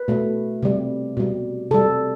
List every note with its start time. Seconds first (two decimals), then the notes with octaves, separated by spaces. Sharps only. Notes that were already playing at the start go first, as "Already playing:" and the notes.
Already playing: B4
0.08 B2 A3
0.63 C3 G3
1.17 B2 G3
1.71 C3 G3 A4